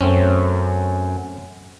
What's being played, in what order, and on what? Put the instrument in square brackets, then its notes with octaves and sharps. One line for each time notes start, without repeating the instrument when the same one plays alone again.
[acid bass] F#2 [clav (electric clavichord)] A3 C4 C#4